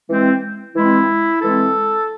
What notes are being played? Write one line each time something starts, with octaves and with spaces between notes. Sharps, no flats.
E3 G#3 C4
E3 G#3 C4 E4
E3 G#3 C4 A4